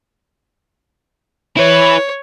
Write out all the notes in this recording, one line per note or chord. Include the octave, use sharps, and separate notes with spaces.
E4 B4 C#5